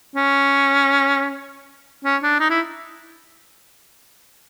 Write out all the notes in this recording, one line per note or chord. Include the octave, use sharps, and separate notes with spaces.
C#4
C#4
D4
D#4
E4